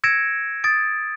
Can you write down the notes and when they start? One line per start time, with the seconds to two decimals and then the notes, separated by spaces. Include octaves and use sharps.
0.04 E6 G#6 A#6 C#7 D7 E7
0.64 D#6 A6 D7